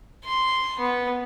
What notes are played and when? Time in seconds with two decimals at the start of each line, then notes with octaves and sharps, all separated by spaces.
0.25 C6
0.79 B3